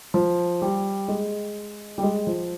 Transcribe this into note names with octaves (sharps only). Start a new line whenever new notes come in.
F3
G3
G#3
G3
G#3
F3